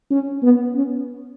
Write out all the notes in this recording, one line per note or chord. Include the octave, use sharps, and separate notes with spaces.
C#4
B3
C#4